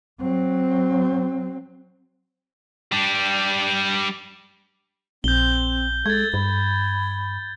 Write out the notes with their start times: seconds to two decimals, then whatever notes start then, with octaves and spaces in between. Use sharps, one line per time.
0.20 F#3 C4
2.92 G3 D4
5.24 A#1 C4 G6 G7
6.06 G#3 A4 G#6 A6
6.34 G2 B5